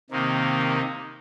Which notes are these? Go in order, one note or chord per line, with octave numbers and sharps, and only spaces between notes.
C3 D#3 A#3 D#4